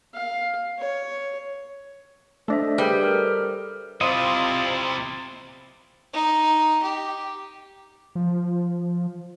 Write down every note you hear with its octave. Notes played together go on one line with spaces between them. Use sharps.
F5
C#5
A3 D4 A4 C5 D#5 E5
G3 G#4 B4 G5
A4 A#4 F6
C3 C4 E4 F4 D5 D#5
D#4
G4
F3